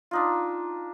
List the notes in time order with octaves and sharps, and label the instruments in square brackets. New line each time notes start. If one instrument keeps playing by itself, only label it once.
[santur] D4 D#4 F4